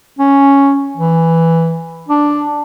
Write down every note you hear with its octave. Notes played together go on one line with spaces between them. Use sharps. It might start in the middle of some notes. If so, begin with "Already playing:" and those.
C#4
E3
D4